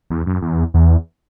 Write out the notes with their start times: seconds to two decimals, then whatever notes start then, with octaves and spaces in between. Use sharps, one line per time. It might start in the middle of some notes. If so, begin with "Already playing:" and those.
0.10 E2
0.26 F#2
0.42 E2
0.74 E2